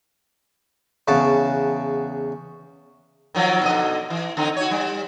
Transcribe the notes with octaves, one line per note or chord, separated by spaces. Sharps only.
E2 C#3 F#4 A5
D#3 F3 F#3
B2 D3 D#5
E3
D3 C4 D#4
F#4 C#5
G3